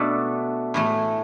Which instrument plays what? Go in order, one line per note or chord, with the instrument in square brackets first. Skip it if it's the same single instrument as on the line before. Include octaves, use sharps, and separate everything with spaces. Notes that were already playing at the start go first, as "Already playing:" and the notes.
Already playing: [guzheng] B2 A3 D4 A4 D5
A2 E3 A3